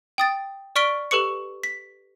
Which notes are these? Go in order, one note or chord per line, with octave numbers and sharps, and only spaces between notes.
G5 D#6 A6
D5 C#6 F6 B6 D7 G7
G4 A4 B4 C#6 C#7
B6